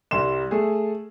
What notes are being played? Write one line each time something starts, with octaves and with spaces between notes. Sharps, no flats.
C2 G3 C6 E7
A3 G#4